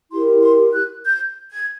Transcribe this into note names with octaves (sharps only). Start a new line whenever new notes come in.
E4 G4 A#4 C6
C6
F#6
G6
G#6